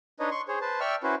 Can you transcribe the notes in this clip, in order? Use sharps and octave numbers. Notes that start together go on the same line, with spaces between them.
D4 D#4 B4 C#5 D#5
C6 C#6
G#4 C5 C#5
B4 C5 A5
D5 E5 G5 C#6 E6 F6
C#4 E4 F#4 B4 C5